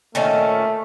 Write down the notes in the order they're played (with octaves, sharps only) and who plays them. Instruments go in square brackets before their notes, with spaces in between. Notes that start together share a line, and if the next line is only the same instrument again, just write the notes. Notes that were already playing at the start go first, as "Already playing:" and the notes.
[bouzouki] A#2 D#3 C#4 [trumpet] A3